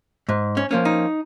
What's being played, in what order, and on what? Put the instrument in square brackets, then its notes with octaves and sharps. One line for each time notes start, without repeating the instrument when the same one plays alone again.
[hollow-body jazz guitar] G#2
C#4
F3 A#3 C#4
D#4